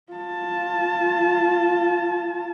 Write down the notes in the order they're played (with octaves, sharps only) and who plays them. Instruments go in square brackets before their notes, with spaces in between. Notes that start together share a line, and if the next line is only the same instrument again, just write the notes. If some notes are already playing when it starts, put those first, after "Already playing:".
[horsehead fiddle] F4 A5